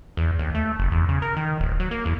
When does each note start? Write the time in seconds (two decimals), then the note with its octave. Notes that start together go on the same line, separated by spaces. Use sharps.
0.17 E2
0.39 D#2
0.55 A3
0.79 F#1
0.92 E2
1.09 C#3
1.22 A#4
1.37 D#3
1.60 D1
1.80 F#3
1.91 A#3
2.05 E2